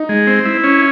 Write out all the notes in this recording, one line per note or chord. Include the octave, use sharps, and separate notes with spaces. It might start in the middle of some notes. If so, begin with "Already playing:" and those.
Already playing: D#4
G#3
C4
E4
C#4